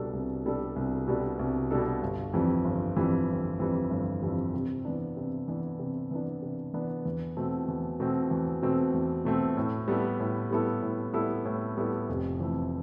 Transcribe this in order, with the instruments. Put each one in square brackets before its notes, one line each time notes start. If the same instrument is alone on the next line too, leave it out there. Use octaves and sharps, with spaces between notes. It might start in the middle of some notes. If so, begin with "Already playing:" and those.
Already playing: [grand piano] C2 B2 G3 D4 A4
C2
B2 G3 D4 A4
C2
B2 G3 D4 A4
C2
B2 G3 D4 A4
G1
F2 E3 G3
G1
F2 E3 G3
G1
F2 E3 G3
G1
F2 E3 G3
C3
E3 B3 D4
C3
E3 B3 D4
C3
E3 B3 D4
C3
E3 B3 D4
E2
B2 A3 C4
E2
B2 A3 C4
E2
B2 A3 C4
E2
B2 A3 C4
A2
G3 B3 E4 A4
A2
G3 B3 E4 A4
A2
G3 B3 E4 A4
A2
G3 B3 E4 A4
F1
F2 E3 A3